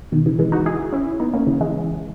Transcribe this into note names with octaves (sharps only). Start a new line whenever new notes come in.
B2 D#3
C#3 E3
E3 G#3
D#4 F#4
E4 G#4
C#4 E4
B3 D#4
A#3 C#4
C#3 E3
E3 G#3